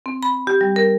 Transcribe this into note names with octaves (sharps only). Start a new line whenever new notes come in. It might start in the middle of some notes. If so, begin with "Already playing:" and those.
C4
B5
G4
G3
A#4